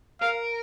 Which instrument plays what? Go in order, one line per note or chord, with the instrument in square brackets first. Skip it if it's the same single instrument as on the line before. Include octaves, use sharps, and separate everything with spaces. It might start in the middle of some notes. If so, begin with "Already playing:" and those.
[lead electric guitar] A#4 [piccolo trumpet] F5